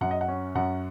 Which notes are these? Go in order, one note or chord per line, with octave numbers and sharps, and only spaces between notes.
F#2 F#5
D#5
F#5
C#4
F#2 F#5